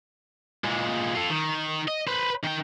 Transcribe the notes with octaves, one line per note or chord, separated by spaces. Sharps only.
A#2 G#3
F4 A4
D#3
D#5
B4 C5
D#3 G5